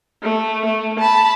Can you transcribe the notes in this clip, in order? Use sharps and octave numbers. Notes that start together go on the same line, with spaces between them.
A3
A3
A5 B5